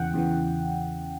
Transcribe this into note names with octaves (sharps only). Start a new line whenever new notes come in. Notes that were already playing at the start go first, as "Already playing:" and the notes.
Already playing: E2 C#3 E3 F#5 G5
E2 C#3 E3